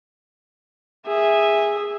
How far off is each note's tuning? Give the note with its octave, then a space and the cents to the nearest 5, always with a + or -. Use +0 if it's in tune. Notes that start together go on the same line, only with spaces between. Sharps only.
G#4 -15 E5 -5